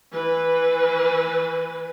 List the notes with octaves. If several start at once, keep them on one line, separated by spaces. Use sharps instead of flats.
E3 B4